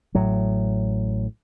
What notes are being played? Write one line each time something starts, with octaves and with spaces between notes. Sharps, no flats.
A1 A2 F#3